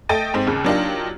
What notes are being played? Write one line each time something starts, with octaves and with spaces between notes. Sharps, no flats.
A3 A4 D#5 G5 A6 D#7
G#2 C4
D#2 C#3
F#3 A#3 D4 D#4 F4 G4